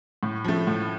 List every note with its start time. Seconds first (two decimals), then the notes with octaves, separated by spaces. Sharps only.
0.23 A2
0.44 F3 A3
0.67 A2